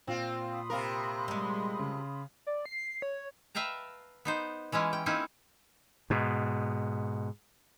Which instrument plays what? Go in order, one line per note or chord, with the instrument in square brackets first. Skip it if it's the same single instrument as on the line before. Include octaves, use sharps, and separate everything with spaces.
[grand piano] A#2 [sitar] C4 F4
[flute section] B5 C6 D#6
[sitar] C3 F4 A#4
[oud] G3 G#3
[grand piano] C#3
[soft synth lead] D5
C7
C#5
[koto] B4 E5 F5 G5 A5 A#5
B3 D#4 C5
E3 G#3 C#4 E4 F4
G5
A#3 C4 C#4 D#4 E4 G#4
[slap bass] G#2 B2